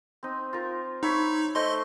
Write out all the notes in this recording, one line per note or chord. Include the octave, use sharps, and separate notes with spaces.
C4 D#4
F4 A#4
D#4 C#5 E5 B5
A3 C5 D#5 C6